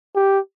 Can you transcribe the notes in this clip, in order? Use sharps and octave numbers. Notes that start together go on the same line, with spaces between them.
G4